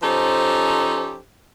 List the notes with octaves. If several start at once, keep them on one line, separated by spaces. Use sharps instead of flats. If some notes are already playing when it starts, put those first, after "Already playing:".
F3 C#4 D#4 G4 A4 C5